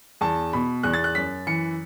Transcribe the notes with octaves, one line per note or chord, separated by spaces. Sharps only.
E2 A5
B2 B5
E2 F#6
A6
F#6
F#2 B6
E3 C#7